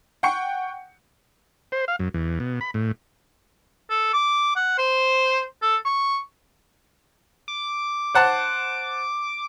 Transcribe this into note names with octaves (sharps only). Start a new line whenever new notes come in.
F#5 G5 C#6 C#7
C5
F5
F#2
E2
B2
B5
A2
A4
D6
F#5
C5
A4
C#6
D6
C5 F#5 A5